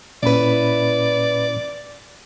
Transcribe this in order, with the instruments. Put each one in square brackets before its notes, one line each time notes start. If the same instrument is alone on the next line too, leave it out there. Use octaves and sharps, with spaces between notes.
[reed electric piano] A#2 C#4 B5 [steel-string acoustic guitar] E4 B4 [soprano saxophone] D5